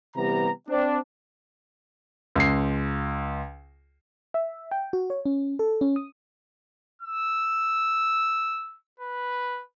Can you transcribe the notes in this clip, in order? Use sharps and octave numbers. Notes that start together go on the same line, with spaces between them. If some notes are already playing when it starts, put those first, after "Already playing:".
C3 E3 G3 B3 G4 A#5
C4 D4
C#2 C7
E5
G5
F#4
C#5
C#4
A4
C#4
D#6
E6
B4